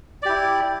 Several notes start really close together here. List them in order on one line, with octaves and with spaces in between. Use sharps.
D5 G4 E4